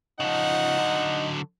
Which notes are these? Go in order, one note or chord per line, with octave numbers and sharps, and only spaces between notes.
C#3 F3 D#4 F#5
D3 F#3